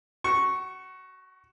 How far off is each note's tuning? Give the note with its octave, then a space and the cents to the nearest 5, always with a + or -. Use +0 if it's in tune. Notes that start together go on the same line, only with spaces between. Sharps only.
F#4 +25 C#6 -5